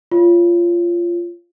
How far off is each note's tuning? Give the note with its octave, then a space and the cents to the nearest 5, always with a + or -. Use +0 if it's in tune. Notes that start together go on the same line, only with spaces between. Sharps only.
F4 -15 C#5 +10